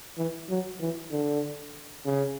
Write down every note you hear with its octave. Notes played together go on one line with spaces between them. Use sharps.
E3
F#3
E3
D3
C#3